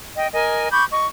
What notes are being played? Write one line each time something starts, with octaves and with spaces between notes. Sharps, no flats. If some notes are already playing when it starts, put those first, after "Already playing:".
D#5 G5
A#4 D#5 G#5
B5 C#6 D6 G6
D#5 C#6